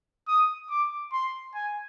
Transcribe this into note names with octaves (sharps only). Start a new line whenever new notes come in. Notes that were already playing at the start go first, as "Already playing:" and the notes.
D#6
D6
C6
G#5